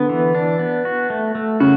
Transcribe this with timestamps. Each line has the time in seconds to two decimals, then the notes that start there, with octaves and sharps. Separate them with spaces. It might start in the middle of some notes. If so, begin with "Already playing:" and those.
Already playing: D3 B3
0.09 E3
0.35 D4
0.59 B3
0.85 F#4
1.10 A3
1.35 A3
1.60 C#3 F#4